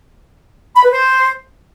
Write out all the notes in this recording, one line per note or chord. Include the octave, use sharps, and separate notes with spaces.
B5
B4
C5